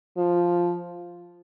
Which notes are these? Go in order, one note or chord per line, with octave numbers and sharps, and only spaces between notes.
F3